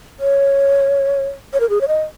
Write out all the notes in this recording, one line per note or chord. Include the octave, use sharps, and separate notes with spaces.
C#5
C#5
A#4
G#4
C#5
D#5